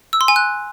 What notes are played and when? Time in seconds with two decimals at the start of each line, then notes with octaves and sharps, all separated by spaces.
0.13 E6
0.21 C6
0.28 G#5
0.36 F#6